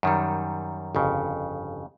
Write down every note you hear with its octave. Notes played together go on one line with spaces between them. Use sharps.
F#2 D#3 G3
G1 F2 C#3